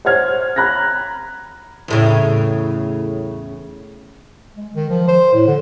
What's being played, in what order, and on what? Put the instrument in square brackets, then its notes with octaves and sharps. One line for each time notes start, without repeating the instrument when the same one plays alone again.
[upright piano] C5 C#5 F#5 F6 G#6
A#5 B5 F#6 G#6 A#6
[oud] E2 A2 C#3
[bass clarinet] G#3
D#3
F3
C5
A2
D3